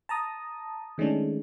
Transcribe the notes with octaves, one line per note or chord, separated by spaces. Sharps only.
A5 A#5 D#6
D#3 G#3 A3 C#4 D4